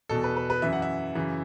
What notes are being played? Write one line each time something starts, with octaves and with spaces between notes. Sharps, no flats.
E2 B2 A4
B4
B4
B4
F#2 E3 E5
F#5
E5
F#2 C#3 E3